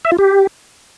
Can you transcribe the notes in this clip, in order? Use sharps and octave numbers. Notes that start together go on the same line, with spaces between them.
E5
F4
G4